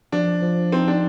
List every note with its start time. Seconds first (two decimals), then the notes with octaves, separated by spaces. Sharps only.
0.12 F3 D4
0.42 F3
0.72 C4 D#4
0.88 D4